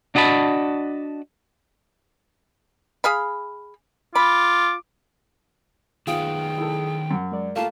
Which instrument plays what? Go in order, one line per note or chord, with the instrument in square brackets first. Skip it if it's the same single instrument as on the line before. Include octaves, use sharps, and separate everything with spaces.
[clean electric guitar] D4 F#4 D#5 A5 B5
[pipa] G#4 F5 B5
[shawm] F4 [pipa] B5 [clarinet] D6
[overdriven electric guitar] D#3 B3 [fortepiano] F4 [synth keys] G#4 D#6 [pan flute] G5
[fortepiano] E4 A4
F#2
[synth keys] G#3 A#4 D5
[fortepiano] A3 A#3 F4 [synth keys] F5 [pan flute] A5